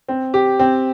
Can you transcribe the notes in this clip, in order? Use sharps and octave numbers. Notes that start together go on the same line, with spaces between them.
C4
G4
C4